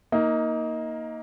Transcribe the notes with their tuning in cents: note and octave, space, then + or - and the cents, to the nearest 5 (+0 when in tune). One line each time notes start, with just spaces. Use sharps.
A#3 +0 D#4 +20